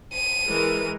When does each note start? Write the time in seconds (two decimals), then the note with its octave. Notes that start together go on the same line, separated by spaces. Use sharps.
0.14 D#7
0.47 E3 G#3 A#4